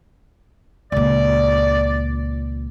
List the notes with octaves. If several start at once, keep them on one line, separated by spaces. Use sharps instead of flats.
C#2 A#2 D5